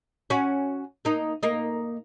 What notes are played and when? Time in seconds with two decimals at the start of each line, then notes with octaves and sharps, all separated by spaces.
0.30 C#4 F#4
1.05 A#3 D#4
1.43 A#3 D#4